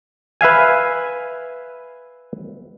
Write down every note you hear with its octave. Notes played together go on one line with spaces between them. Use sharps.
B4 E5 F5 G#5